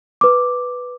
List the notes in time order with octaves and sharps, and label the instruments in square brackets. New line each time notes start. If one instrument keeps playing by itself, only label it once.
[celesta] B4 D6